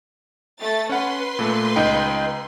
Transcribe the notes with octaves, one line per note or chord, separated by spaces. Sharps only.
A3 A6
C#4 B4 F#5 C6
A#2 A3
C#2 D#4 G5